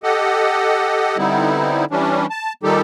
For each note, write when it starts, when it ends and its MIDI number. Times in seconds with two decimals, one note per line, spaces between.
0.03 1.17 67
0.03 1.17 69
0.03 1.17 75
0.03 1.17 78
1.17 1.85 50
1.17 1.85 55
1.17 1.85 59
1.17 1.85 60
1.17 1.85 63
1.17 1.85 64
1.91 2.26 52
1.91 2.26 55
1.91 2.26 61
1.91 2.26 62
2.30 2.53 81
2.63 2.81 46
2.63 2.81 51
2.63 2.81 55
2.63 2.81 63
2.63 2.81 67
2.63 2.81 69